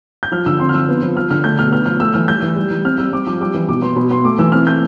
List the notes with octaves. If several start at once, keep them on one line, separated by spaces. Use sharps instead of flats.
G6
F3 F6
D3 E6
C4 C6
F6
F3 E6
B3
F3
F3 F6
D3 F6
A3 G6
B2 F6
B3 F6
F3 F6
A3 E6
E3 F6
G3 G6
E3
G3
E3
C4 F6
G3 E6
C4 D6
F3 D6
G3 D6
E3
B2 D6
B3 C6
B2 B5
B3 C6
A3 D6
E3 E6
C4 F6
A3 G6